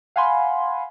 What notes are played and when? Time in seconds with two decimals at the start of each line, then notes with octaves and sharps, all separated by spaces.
0.16 F5 F#5 G#5 B5 C6